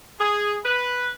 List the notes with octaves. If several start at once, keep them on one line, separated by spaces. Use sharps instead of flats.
G#4
B4